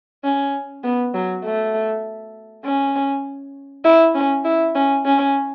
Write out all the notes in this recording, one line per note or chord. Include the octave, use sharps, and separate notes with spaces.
C#4
B3
F#3
A3
C#4
E4
C#4
E4
C#4
C#4